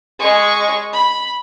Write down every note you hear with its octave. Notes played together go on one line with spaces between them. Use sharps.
G#3 C#6
B5